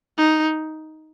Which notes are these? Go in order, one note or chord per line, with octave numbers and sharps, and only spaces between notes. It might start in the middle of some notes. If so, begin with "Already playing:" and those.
D#4